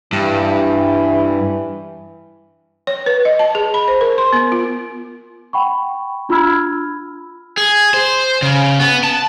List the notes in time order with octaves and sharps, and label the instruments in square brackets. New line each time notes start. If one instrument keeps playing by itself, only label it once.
[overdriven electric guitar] G2 [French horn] E3
[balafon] C#5
B4
D#5
A5
G#4
B5
C5
A#4
C6
B3
F4
[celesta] F#5 G5 B5 C#6
D4 F4 B5 E6 F6 G#6
[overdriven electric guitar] G#4
C5
C#3
B3
A5